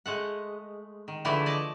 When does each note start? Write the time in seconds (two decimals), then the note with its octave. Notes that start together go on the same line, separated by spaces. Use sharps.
0.06 G#3 A3 F#5
1.08 D#3
1.25 D3 E3 F3 A3 E4 G#4
1.46 D5 D#5 A5